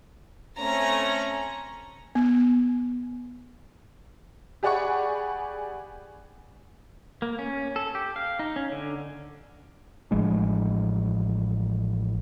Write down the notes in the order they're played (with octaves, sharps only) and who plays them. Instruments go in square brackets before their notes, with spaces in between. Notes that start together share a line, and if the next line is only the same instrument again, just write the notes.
[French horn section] A3 C#4 [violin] C4 A#5
[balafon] B3
[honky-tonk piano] G4 G#4 D5 F#5 B5 C#6
[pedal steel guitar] A#3
C#4
A4
G4
F5
D#4
C#4
D3
[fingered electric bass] A1 F3 G#3 D4